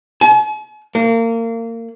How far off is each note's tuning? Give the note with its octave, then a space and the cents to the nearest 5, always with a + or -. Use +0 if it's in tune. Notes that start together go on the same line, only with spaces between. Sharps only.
G#5 +45
A#3 -30